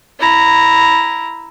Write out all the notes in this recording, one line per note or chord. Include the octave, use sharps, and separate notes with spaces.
E4 A#5